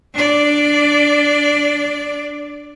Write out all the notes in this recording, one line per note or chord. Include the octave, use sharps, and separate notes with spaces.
D4 D5